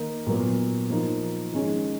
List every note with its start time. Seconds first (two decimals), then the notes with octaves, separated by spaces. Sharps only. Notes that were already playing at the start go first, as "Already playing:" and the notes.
Already playing: D#3 A#3 D#4
0.27 A#2 F#3 B3
0.90 F3 A#3 D#4
1.53 D#3 G#3 C#4